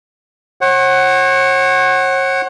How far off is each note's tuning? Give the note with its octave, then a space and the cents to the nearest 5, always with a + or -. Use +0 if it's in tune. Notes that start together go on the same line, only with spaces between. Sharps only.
C#5 -40 F#5 +15